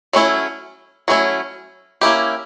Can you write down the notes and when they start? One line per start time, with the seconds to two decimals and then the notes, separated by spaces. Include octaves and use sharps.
0.13 F#3 A3 C#4 E4
1.08 F#3 A3 C#4 E4
2.01 A#3 C#4 E4 G4